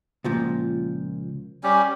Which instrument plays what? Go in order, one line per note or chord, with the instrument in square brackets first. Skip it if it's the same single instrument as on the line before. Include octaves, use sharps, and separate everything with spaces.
[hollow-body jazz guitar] C#2 A#2 F3
[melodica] G3 C#4 G4